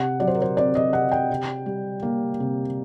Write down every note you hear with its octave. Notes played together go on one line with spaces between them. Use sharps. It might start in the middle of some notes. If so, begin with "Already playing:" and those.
Already playing: C3 F#5
F#3 D5
C5
A#4
C5
C4 D5
D#5
C3 F#5
G5
C3
G3
A#3
C3